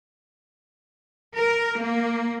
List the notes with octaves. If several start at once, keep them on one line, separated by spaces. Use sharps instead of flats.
A#4
A#3